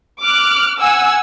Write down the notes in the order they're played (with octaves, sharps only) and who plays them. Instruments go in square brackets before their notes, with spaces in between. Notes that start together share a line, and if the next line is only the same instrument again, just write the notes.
[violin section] D6 F6 F#6
F#5 G#5 E6